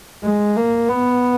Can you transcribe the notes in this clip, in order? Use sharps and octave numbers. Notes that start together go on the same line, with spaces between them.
G#3
A#3
B3